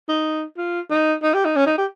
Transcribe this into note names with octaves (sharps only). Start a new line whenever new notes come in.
D#4
F4
D#4
D#4
G4
D#4
C#4
D#4
G4